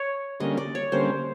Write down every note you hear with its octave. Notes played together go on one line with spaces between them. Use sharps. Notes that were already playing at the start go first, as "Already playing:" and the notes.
Already playing: C#5
D3 G3 A#3 C#4 D#5
D5
C#5
D3 G3 A#3 C#4 C5